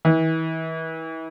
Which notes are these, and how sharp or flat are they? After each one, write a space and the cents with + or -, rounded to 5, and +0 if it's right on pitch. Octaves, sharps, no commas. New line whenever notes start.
E3 -35